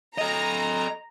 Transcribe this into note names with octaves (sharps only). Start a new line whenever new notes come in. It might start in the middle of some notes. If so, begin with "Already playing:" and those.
A4 D#5 A#5